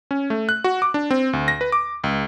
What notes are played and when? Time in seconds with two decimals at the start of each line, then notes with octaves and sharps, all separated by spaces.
0.11 C#4
0.30 A3
0.49 F#6
0.64 F#4
0.82 D6
0.94 D4
1.11 C4
1.33 D2
1.48 A#6
1.61 B4
1.72 D6
2.04 C#2